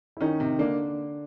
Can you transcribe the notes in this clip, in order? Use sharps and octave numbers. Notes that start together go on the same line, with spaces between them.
E4
D#3 C#4 D#4
C3
D3 A#3 D4